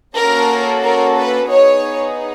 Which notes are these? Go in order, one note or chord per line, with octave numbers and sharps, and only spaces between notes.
A#3 C#4 F#4 A4 A#4
A#4
B4
B3 D#4 G#4 C#5